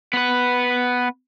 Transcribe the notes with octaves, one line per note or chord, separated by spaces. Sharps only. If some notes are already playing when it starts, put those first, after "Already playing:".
B3 B4